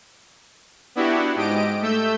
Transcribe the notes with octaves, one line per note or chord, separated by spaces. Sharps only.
B3 D4 E4 F#4 G4
G#2 G4 D#5 D7
A3 E6 G6